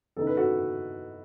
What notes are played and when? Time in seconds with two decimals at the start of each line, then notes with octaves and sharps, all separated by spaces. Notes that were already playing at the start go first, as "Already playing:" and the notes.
0.16 C#3 E3 B3 D#4 A4
0.27 B4
0.37 F#4 A4